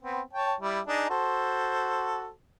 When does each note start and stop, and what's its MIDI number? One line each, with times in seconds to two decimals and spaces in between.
0.02 0.21 59
0.02 0.21 60
0.33 0.54 73
0.33 0.54 79
0.33 0.54 81
0.60 0.80 55
0.60 0.80 64
0.87 1.06 62
0.87 1.06 63
0.87 1.06 68
1.10 2.30 66
1.10 2.30 69
1.10 2.30 72